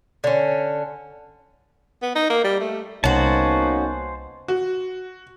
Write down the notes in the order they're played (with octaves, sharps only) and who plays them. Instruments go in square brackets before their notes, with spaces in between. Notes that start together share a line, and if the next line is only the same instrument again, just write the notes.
[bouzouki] D3 C#4
[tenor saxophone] B3
D#4
A#3
G3
A3
[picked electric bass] C2 [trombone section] A#3 B3 D#4 [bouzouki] C#4 F#4 [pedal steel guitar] C5 A5
[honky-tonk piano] F#4